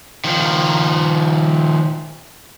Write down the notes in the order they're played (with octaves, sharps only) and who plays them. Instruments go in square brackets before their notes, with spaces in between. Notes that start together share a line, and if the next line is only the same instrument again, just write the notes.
[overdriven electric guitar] D#3 F3